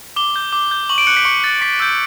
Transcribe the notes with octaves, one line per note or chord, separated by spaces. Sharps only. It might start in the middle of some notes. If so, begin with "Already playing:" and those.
D6 G7
G6
D6
G6
C#6 F#7
D7
F#6 C#7
B6
C#6 C#7
F#6 A6
C#6 B6
E6 G6 D7